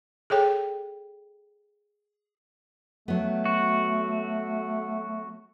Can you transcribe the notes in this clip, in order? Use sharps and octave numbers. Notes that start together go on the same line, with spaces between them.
G#4 A4 C#5 G5
F#3 A3 B3
F#4